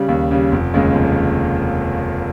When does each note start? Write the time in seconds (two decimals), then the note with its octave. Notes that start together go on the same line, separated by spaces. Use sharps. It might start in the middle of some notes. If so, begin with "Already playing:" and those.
Already playing: C#3 G3
0.08 D#2
0.31 C#3 G3
0.52 F1
0.74 D#2 C#3 G#3
0.95 F1